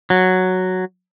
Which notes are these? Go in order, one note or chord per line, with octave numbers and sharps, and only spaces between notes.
F#3